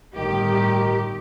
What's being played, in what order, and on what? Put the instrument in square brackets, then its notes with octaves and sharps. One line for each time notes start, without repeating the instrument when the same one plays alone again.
[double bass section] G1 A2 G3 [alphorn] D#3 [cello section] G4